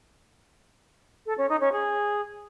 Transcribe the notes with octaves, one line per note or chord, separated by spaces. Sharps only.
A4
C#4
D#4
C#4
G#4